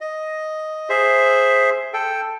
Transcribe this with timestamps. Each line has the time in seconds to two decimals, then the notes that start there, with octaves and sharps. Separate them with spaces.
0.01 D#5
0.89 G#4 C5 E5
1.93 A4 G5